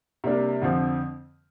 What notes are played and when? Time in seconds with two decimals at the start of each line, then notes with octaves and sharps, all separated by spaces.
0.24 C3 G3 A#3 D4
0.62 F2 D3 F3 C4